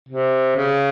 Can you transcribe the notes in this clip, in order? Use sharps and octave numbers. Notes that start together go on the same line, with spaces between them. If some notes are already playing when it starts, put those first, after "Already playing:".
C3
C#3